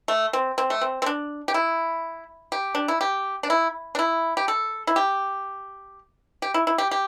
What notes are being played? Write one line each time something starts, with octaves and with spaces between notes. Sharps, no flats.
A3
C4
C4
A3
C4
C4
D4
G4
E4
G4
D4
E4
G4
D4
E4
D4
E4
G4
A4
E4
G4
G4
E4
E4
G4
G4